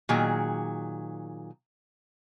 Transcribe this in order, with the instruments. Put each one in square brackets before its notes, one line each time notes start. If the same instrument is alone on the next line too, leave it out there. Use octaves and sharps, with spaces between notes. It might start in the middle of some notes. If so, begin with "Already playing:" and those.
[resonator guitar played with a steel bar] A#2 D#3 F#3 G#4